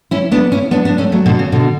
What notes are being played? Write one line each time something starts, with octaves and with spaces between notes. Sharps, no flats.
C#4 E4
B3 D4
C#4 E4
B3 D4
B3 D4
A3 C#4
F#3 A3
B2 D3
C#3
B2 D3